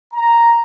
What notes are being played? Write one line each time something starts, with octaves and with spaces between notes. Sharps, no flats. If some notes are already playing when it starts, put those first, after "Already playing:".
A#5